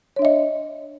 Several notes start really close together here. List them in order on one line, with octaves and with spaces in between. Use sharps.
C#5 D4 E5 D#5